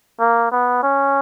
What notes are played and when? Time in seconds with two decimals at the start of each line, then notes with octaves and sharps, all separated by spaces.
0.20 A#3
0.51 B3
0.83 C#4